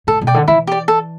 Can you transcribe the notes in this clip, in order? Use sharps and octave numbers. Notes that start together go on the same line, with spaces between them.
A2 A4
B2
D5 G5
D3
E3 E4
G4 D5
A4